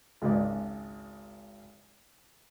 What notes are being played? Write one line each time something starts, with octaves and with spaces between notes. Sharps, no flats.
G#1 C#2 D5